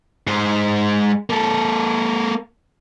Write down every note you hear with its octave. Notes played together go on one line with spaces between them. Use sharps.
G#2 G#3
A#3 A4